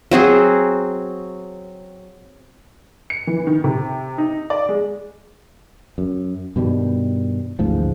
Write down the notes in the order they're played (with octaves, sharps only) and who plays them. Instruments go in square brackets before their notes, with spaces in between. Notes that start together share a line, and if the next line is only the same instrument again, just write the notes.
[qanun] F#3 C4 F#4 G#4
[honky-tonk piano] C#7
E3
D#3
C3
D#4
D5
G#3
[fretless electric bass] F#2
G2 B2 D#3 G3
A1 D2 G#2 F3